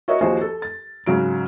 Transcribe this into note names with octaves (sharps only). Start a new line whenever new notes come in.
F#4 A#4 C#5 D#5 E5
D#2 F3 F#4 G#4 C5 D#5
A4
A6
G#2 C#3 F#3 D7